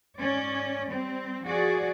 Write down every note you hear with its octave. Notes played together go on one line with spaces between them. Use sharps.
G#2 C#4 D5
G3 C4
F3 F#4 G#4 D5